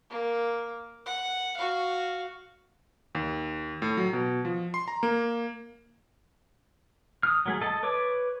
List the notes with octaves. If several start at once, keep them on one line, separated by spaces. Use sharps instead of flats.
A#3
F#5
F#4 F5
D#2
A2
F#3
B2
F3
C6
A#5
A#3
D#6 F6
F#3 A3 G#4
A4 D#5 A5
B4 C#5 D6